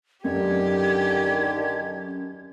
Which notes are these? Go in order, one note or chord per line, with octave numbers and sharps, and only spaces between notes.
F#2 D3 D#3 G4 G#6